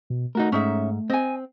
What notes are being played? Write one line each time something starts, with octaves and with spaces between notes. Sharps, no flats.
B2
A3 D#4 F#4 A#4
G#2 C#4 D#4 E5
C4 D#5 G#5